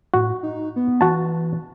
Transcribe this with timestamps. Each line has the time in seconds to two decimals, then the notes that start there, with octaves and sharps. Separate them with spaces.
0.14 A2 F#4
0.43 D#4
0.76 B3
1.01 E3 F#4 A5